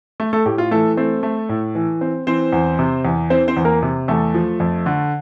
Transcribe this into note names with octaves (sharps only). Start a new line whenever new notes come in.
A3
A3 A4
A2 G4
F4
E3 A3 A4
A3 C4 A4
A3
A2
E3
C4
E3 C4 C5
E2
C3
E2
E3 C4 C5
C4 C5
E2
A#3 A#4
C3
E2 A3 A4
F3
F2
D3